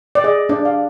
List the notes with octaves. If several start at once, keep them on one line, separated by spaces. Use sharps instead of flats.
D5
G#4 D#5
D4 D5
F5